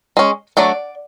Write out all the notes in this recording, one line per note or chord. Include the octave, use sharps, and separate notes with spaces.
G#3 C#4
F#3 A3 D4 D5